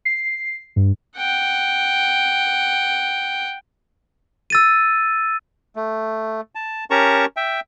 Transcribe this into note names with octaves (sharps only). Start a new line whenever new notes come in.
C7
G2
F#5 G5
E6 A6 D#7
A3
A5
C#4 G4 A#4 A5 A#5 C#6
E5 G5